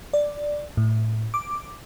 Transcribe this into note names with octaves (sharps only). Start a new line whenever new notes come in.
D5
A2
D6